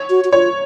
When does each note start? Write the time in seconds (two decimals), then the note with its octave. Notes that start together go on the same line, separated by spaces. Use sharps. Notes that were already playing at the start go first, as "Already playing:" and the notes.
Already playing: C#5
0.10 F#4
0.24 F#4
0.33 F4 C#5